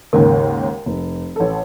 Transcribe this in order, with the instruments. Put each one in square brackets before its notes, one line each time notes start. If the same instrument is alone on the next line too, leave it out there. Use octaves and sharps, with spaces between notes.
[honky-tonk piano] D#2 G#2 C#3 [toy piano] A#4 D#5
[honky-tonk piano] F1
A1 A4